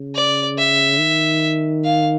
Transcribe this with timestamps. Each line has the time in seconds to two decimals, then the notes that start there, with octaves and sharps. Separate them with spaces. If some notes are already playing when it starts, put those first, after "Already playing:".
Already playing: C#3
0.15 D5
0.58 E5
1.00 D#3
1.84 F5